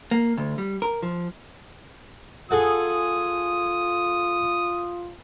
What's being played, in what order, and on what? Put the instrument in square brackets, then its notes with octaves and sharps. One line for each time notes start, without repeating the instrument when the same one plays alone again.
[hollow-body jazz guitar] A#3
D2
G3
A#4
F3
[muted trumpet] F4 [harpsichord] G#4 A4 F#5 [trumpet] D#6